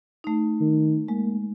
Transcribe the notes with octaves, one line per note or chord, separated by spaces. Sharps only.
A3 D#4
D#3
G#3 A#3